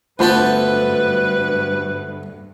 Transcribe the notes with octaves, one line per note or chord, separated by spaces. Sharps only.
D2 G2 B3 F4 A4 B4 C5 B5